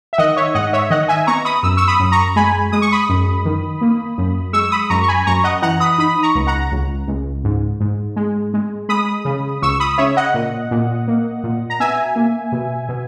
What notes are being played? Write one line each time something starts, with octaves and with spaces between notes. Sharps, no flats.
E5
D#3 D#5 F#5
C#5 E5
G#2 D#5 F#5
C#5 E5
D#3 D#5 F#5
E5 G#5
B3 A#5 C#6
B5 D#6
F#2 E6
C#6 E6
B5 D#6
F#2
A#5 C#6
G#3 G#5 B5
G#3 D#6
C#6
B5 D#6
F#2
D#3
A#3
F#2
G#3 C#6 E6
B5 D#6
F#2 A#5 C#6
C#6
G#5 B5
F#2 A#5 C#6
D#5 F#5
E3 F#5 A#5
B5 D#6
D#4 B5 D#6
A#5 C#6
C#2
F#5 A#5
C#2
C#2
G#2
G#2
G#3
G#3
G#3 B5 D#6
C#3
C#2 C#6 E6
B5 D#6
C#3 C#5 E5
D#5 F#5
A#2
A#2
A#3
A#2
A#5
B2 E5 G#5
A#3
B2
B2